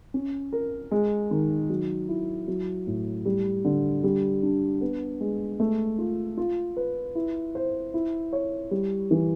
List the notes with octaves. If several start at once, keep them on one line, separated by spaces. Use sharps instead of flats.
C#4
A#4
G#3
D#3
F#3
E4
F#3
A2
G3
D3
G3
D4
B3
G#3
A3
F4
F4
B4
E4
C5
E4
C#5
G3
E3